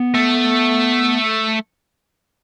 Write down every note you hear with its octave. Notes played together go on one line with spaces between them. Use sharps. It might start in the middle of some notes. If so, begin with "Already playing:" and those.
Already playing: B3
A3